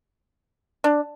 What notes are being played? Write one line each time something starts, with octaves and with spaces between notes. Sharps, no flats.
D4